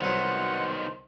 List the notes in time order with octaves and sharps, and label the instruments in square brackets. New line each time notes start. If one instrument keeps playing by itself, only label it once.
[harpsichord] C2 F#3 [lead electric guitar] B2 D#3 [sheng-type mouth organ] F#5 [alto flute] C6